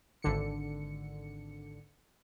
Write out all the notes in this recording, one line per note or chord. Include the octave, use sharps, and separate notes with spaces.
G#1 D3 C#7